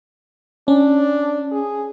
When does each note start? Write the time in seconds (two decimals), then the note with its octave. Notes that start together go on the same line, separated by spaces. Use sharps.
0.68 C#4 D4
1.52 G#4